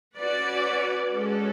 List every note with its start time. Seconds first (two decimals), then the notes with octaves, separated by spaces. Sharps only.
0.18 C#4 F#4 B4 D5
1.13 G#3 C#4 F#4 A4